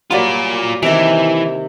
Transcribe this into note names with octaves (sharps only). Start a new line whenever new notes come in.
F#3 G3 A#3 F4 D5
C3 D#3 E3